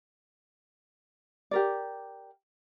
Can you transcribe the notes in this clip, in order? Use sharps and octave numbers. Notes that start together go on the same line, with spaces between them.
G4 A#4 D5